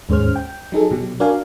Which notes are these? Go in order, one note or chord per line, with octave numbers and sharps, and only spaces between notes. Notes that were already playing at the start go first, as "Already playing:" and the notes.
D#2 G#2 C#4 G#4 C5 F6
G5
F#3 D#4 G#4 A4
B2 F#3 G4
D4 F#4 A#4 D5 F5 G#5